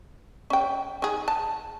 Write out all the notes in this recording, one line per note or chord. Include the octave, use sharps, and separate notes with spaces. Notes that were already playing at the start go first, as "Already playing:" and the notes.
C#4 G5
D#3 G#4
A5